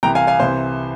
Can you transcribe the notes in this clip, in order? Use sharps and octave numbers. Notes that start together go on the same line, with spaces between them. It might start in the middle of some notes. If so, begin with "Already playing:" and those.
C2 C3 E3 G5 A#5
F5 G#5
F5 G#5
C2 C3 E3 C5